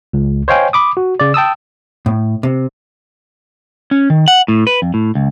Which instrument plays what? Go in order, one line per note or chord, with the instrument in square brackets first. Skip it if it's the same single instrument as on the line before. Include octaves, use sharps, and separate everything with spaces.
[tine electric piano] C#2
C5 C#5 D#5 F5 G5 G#5
B5 D6 D#6
F#4
C#3 D5
G5 A5 D#6 E6
[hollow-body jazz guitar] A2
C3
[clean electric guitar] C#4
D#3
F#5
A2
B4
F2
A2
C#2